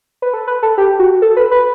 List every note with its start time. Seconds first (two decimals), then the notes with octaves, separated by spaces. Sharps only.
0.22 B4
0.34 A4
0.47 B4
0.63 A4
0.78 G4
0.99 F#4
1.22 A4
1.37 B4
1.51 B4